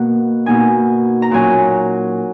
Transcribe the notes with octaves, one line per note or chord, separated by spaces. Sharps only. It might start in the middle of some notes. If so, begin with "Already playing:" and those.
Already playing: B2 A#3 F#5
B2 A#3 D#4 G#5
A#5
A#2 F#3 C#4 G#5